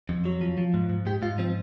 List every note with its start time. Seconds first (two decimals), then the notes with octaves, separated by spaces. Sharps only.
0.09 F2
0.25 F#3
0.41 F3
0.58 F3
0.74 G#2
0.89 G#2
1.06 G#2 G4
1.22 G#2 F4
1.38 F3 C4